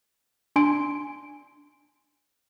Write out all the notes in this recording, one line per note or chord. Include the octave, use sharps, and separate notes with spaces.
D4 G#5 C6 D7